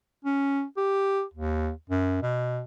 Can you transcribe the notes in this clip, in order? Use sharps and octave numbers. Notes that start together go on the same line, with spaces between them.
C#4
G4
D#2
F#2
B2